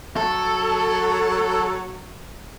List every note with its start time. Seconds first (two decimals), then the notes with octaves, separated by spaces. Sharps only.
0.16 F#3 A4